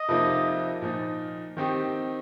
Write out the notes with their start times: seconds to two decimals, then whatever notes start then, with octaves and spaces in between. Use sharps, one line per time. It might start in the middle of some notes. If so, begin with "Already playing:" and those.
Already playing: D#5
0.08 F2 C3 F3 A#3 D#4
0.82 A#2 F3 D#4
1.57 D#3 C4 D#4 G4